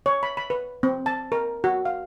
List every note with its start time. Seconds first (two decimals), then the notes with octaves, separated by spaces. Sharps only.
0.06 C#5
0.23 B5
0.37 B5
0.50 B4
0.83 C4
1.06 A5
1.32 A#4
1.64 F#4
1.85 F5